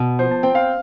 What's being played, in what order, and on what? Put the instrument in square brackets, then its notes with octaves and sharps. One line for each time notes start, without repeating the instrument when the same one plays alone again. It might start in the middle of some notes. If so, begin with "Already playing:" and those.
Already playing: [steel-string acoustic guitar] B2
[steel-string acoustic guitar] F3 [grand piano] C5
[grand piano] A5
[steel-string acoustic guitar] C4 [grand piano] G5
[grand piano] F5